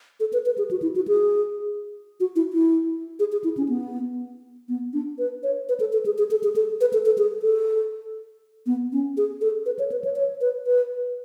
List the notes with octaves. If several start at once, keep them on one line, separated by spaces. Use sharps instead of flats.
A4
B4
B4
G#4
F#4
E4
F#4
G#4
F#4
E4
E4
G#4
G#4
E4
C#4
B3
B3
D4
B4
C#5
B4
A4
A4
G#4
G#4
A4
G#4
A4
B4
A4
A4
G#4
A4
B3
C#4
G#4
A4
B4
C#5
B4
C#5
C#5
B4
B4